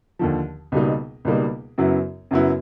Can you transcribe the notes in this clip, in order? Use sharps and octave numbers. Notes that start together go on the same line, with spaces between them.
D#2 D3 F3
C#2 B2 G3 A#3 D#4
C#2 B2 G3 A#3 D#4
F#2 C#3 F#3 B3 E4
F#2 C#3 F#3 B3 E4